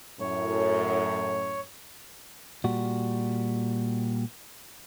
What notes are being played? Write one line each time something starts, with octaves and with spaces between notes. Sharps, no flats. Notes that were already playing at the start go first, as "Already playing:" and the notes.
F#2 A2 C#5
A#2 G3 F#4